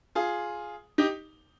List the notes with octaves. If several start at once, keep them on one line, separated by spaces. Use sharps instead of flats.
F4 G#4
D#4 G4